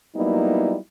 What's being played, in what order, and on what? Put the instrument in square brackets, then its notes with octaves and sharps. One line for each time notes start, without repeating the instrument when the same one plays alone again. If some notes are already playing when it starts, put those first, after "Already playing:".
[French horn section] F#3 G3 A#3 B3 D#4 E4